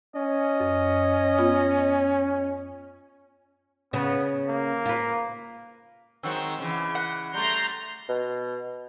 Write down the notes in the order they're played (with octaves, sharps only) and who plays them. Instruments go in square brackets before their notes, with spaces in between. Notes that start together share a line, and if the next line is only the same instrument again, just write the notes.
[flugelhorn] C#4 [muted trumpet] D#5
[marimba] F#2
B3 F4 G#5
[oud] C#3 [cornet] B3
[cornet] A#3
[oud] F4 B4
[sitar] D#3 F#3 G#3 [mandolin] C4 F#4 C5
[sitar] C#3 E3
[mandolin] F#5
[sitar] G3 A3 [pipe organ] A#5 C6 G6
[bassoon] B2